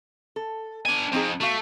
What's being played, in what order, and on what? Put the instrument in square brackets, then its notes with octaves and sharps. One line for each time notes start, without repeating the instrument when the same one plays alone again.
[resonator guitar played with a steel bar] A4
[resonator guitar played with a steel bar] B3 [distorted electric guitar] D4 G#5
[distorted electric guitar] F2 [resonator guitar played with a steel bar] C4 D#4 G#4
[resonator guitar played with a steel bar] B2 F#4 F5 [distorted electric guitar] A3